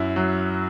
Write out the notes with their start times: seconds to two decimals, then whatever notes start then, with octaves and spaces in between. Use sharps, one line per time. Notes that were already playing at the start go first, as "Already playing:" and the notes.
Already playing: F#2 E4
0.16 F#3